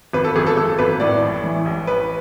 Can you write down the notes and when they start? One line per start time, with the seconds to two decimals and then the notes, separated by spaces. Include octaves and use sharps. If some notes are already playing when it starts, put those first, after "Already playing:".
0.13 G#1 B4
0.24 A4
0.36 G#1 G#4
0.46 A4
0.57 G#1 A4
0.78 G#1 B4
1.00 A2 D5
1.22 A1
1.43 E3
1.66 A1
1.87 A1 B4